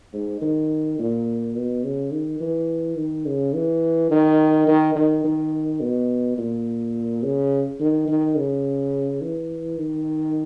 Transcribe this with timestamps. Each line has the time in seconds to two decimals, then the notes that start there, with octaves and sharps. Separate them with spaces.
0.13 G#2
0.41 D#3
0.99 A#2
1.55 B2
1.84 C#3
2.12 D#3
2.40 E3
2.97 D#3
3.26 C#3
3.54 E3
4.11 D#3
4.67 D#3
4.95 D#3
5.24 D#3
5.81 B2
6.38 A#2
7.23 C#3
7.80 D#3
8.08 D#3
8.36 C#3
9.21 E3
9.78 D#3